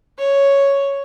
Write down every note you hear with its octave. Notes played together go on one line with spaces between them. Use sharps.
C#5